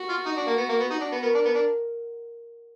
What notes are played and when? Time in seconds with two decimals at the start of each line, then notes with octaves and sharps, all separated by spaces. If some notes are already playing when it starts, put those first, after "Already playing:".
Already playing: F#4
0.09 F4
0.26 D#4
0.37 D4
0.47 A#3
0.58 B3
0.69 A#3
0.80 B3
0.90 D#4 F#4
1.01 D4
1.12 B3
1.22 B3 A#4
1.34 D4
1.45 B3
1.55 D4